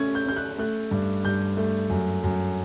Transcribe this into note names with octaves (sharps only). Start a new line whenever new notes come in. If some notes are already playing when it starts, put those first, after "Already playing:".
Already playing: A3 C#4 G#6
G6
C#4 G6
F#6
A3 F#6
G2
G2 G6
A3
F#2
F#2